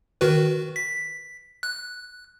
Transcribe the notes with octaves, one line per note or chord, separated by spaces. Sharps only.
D#3 F#4 B4
B6
F#6